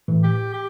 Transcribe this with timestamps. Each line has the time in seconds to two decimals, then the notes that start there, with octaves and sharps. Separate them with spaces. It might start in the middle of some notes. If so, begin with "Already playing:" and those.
0.08 A2 E3
0.23 G4
0.53 G4